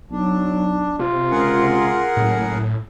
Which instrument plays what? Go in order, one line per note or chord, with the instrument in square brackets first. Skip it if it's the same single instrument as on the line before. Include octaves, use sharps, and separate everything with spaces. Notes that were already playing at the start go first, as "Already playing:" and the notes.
[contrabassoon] B1 [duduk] F#3 [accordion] D4
[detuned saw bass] C3 [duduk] F4
[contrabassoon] C#2 [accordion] G#4 A#4 F#5
[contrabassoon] F#1 [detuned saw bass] A2